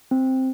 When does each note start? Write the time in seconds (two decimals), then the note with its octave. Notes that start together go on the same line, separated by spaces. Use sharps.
0.11 C4